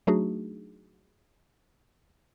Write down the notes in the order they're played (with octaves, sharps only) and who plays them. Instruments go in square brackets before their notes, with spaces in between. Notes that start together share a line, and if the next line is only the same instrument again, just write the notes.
[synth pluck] F#3 A3 D4 D#4 F#4 G#4